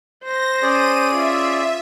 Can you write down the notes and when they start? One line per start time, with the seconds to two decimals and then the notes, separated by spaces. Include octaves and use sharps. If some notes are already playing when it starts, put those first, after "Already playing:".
0.24 C5 A#6
0.62 C#4 G#4 D5 D#7
1.14 F4 E5